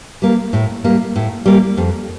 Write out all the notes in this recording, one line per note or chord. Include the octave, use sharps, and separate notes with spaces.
G3 A#3
A2
G3 A#3
A2
G3 A#3
F2